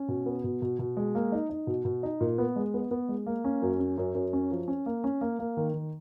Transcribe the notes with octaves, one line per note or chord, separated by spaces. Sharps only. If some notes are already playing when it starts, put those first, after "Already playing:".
Already playing: C#4
B2
B3
B2
B2
B2
G#3
A#3
D#4
D#4
B2
B2
D#4
A#2
B3
G#3
B3
B3
G#3
A#3
C#4
F#2
C#4
F#2
F#2
C#4
F3
C#4
A#3
C#4
A#3
A#3
D#3
D#3